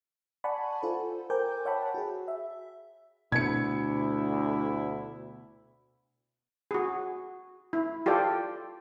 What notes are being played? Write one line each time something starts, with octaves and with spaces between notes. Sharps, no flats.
D5 F#5 G#5 A5 B5 C#6
F4 A4 C5
A#4 C5 G5 G#5 D6 G6
C#5 E5 F#5 G5 A5 B5
F#4 G#4
E5
D2 B2 E4 G#6 C#7
F#4 G#4
E4
F4 G4 A4 D5 G5